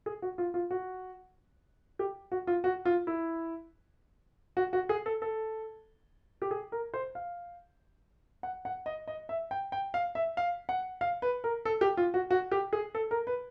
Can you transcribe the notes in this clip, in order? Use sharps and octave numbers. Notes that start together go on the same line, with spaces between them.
G#4
F#4
F4
F4
F#4
G4
F#4
F4
F#4
F4
E4
F#4
F#4
G#4
A4
A4
G4
G#4
A#4
C5
F5
F#5
F#5
D#5
D#5
E5
G5
G5
F5
E5
F5
F#5
F5
B4
A#4
A4
G4
F4
F#4
F#4
G4
G#4
A4
A#4
B4